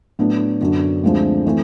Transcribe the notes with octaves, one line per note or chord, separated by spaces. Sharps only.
A2 F#3 B3 D4 F#4
F#2 D3 F#3 B3 D4
D2 D3 F3 G#3 C4
E3 A3 C4